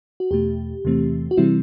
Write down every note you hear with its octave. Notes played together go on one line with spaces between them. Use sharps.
F#4
E2 B2 A3 G4
E2 C3 E3 A3 C4
F#4
C3 E3 G3 C4 E4